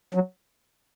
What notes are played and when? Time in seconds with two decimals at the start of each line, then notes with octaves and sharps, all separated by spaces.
0.14 F#3